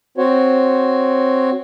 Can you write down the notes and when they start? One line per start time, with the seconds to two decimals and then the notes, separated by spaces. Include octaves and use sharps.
0.18 C4 F#4 C5 C#5